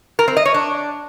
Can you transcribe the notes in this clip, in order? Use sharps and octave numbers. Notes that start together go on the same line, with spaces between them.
A#4
C4
D#5
C#5
D4